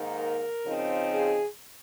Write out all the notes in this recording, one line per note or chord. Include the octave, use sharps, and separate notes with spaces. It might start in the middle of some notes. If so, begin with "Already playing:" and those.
Already playing: G#2 D#3 A#3 D#4
A#4
C#3 F3 C4 D#4
G#4